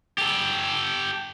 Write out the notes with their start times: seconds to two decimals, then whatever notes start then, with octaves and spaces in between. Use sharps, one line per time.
0.18 G4 A4